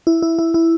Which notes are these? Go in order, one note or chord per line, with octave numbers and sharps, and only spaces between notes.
E4
E4
E4
E4